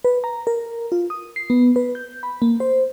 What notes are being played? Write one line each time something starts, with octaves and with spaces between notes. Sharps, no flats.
B4
A#5
A#4
F4
D#6
C7
B3
B4
G6
B5
A#3
C5